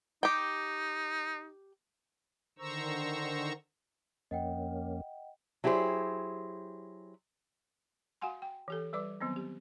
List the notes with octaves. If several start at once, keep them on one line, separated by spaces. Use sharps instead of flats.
D#4 G4 G5
D3 D#3 C5 A#5 C#6 E6
F2 A#3 C#4 D#5 F#5 G5
F#3 E4 G4 G#4 C5
F#4 F5 F#5 G#5 C6
G5
E3 G4 A4
G3 B4 D5 D6
D#3 F#3 B3 C4
G4